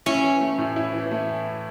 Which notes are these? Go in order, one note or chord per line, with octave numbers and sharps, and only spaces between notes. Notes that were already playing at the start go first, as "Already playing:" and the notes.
C#4 E4
E3
A3
A2
E4
E3
A3